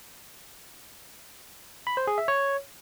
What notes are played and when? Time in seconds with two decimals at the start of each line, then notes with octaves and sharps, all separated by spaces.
1.87 B5
1.97 C5
2.07 G#4
2.18 E5
2.28 C#5